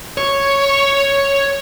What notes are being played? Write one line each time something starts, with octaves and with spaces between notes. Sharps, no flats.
C#5